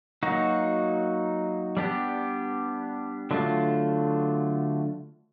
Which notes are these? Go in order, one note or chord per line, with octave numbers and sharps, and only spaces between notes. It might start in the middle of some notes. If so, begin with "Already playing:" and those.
F#3 A#3 D#4 F#4
G3 B3 D4 G4
D3 F#3 A3 D4 F4